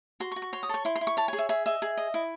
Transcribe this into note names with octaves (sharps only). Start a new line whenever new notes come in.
F#4 C6
C#6
F#4
C#6
C#5 C6
D#6
A4 C#6
E4 C6
C6
E4
C#6
C#5 A5
G#4 G#5
E5
G#4 E5
D#5 E5
G#4
D#5
E4